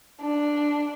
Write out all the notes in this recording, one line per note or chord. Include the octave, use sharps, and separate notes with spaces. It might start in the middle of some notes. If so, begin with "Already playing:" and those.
D4